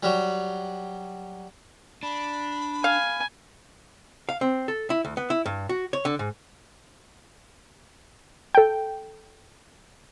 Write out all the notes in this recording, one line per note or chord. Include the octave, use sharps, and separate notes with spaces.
F#3 G3
D4 B5
F5 G#5
F5
C4
A4
E4
D2
B3
E4
G2
F#4
C#5
D3
G#2
A4 G5